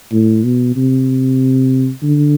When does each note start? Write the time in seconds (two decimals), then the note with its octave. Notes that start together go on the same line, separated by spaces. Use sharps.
0.12 A2
0.44 B2
0.76 C3
2.03 D3